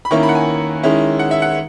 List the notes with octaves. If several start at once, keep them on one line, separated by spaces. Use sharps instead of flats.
B5
D#3 A#3 C#4 E4 C#6
B5
F#5
G#5
D#3 G#3 C#4 E4
F#5
E5
F#5